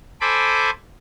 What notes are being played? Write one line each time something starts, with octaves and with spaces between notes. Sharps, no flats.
A4 C5 G#5 B5 D6